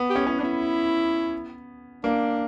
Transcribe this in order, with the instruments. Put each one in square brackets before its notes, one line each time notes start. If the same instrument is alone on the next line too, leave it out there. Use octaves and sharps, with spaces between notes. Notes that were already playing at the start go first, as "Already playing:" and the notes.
Already playing: [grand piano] B3
[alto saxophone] G4
[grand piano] C#4
[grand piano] C#4 [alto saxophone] E4
[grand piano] B3 [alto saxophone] D4
[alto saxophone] E4
[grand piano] A#3 [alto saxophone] D4